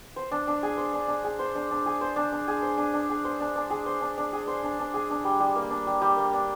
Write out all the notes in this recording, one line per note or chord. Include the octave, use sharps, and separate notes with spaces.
C5
D4
D4
G#4
C5
D4
D4
G#4
C5
D4
D4
G#4
C5
D4
D4
G#4
C5
D4
D4
G#4
C5
D4
D4
G#4
C5
D4
D4
G#4
C5
D4
D4
G#4
D4
G3
G3
A#3
D4
G3
G3
A#3
D4